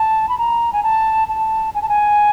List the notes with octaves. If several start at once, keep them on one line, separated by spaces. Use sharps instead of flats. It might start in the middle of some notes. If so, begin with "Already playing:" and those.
Already playing: A5
B5
A#5
G#5
A5
A5
G#5
A5
G#5